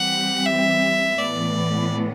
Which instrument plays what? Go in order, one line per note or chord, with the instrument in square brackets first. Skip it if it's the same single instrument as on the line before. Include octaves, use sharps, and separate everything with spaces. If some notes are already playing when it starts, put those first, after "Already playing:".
Already playing: [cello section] E3 G3 C4 G4 [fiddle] F#5
[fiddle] E5
[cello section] A2 E3 B3 [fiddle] D5